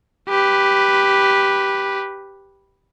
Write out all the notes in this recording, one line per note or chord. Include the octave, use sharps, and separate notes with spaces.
G4 B4